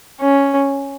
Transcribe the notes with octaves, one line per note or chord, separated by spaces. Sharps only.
C#4